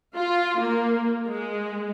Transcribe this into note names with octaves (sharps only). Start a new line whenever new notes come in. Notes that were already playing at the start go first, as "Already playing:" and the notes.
F4
A#3
G#3